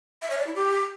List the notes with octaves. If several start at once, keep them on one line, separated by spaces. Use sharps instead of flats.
E5
C#5
D5
E4
G4